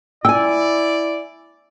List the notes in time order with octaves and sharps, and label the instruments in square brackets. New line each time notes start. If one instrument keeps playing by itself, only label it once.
[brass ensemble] E4 D5 [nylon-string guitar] G5 G#5 [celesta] E6